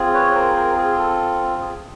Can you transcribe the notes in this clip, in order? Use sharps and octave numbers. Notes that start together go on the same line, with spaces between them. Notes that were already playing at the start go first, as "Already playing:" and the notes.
Already playing: C4 F4 G#4
B4 C#5
A#4 C5
A#4 C5
G#4
A4
G#4